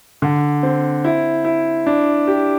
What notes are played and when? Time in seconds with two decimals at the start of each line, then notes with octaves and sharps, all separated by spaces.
0.22 D3
0.63 C4
1.04 E4
1.45 E4
1.86 D4
2.27 G4